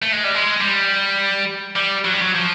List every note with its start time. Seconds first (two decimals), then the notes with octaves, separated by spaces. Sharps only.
0.02 A3
0.13 G#3
0.24 G3
0.35 G#3
0.61 G3
1.76 G3
2.05 F#3
2.14 G3
2.22 F#3
2.35 F3